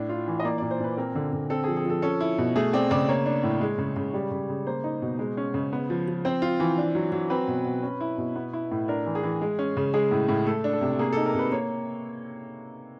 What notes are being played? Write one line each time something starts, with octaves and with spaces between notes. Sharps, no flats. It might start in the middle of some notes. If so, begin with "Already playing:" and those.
Already playing: A2 D4
F4
E3
D#5
A#3 D5
A#2 D5
C5
A#2 B4
C4 A#4
D3
D3
C4 A4
G#4
F3
G#4
F3 A4
C#4 A4
E4
B2
A3 G#4
C4 D5
C#3 D5
A#3 C#5
D4
A2
G#3
C#3
C#3
G3
C#3
C#3
A#3 C5
D#4
B2
G#3
C#4
C#3
B3
F3
F3
C4 C5
F4
E3
D4
F#3
F#3
C4 B4
B2
B2
C#4
E4
B2
B3
E4
A2
D4 A#4
E3
G#4
E3
G#3
C#4
C#3
G#3 G#4
A2
A2
A3 A4
D4
A4
C3
A#3 G#4
D#4 A4
A#4
C3 B4
A#3 C#5